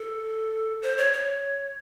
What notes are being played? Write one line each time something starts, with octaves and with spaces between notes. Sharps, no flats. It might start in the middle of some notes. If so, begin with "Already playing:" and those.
Already playing: A4
C5
C#5
C#5